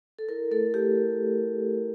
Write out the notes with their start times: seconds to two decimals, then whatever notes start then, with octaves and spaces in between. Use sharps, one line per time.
0.19 A4
0.29 E4 A#4
0.51 A3 A4
0.74 A3 G4